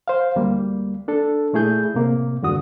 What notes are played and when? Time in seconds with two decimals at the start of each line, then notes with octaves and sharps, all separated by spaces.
0.08 C5 F5
0.36 D2 G3 A#3
1.08 D4 A4
1.53 A#2 A3 E4 G#4 G6
1.94 A2 C3 A#3
2.42 E2 G2 D3 F#4 D#6